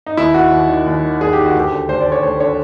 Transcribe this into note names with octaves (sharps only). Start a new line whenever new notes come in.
D#4
D#2 E4
D#3 F#4
D#2
D#3
D#2
D#3
D#2 G#4
D#3 G4
F#4
D2
G4
D3
D2 C5
D5
D3
C#5
D2 C#5
D3 C#5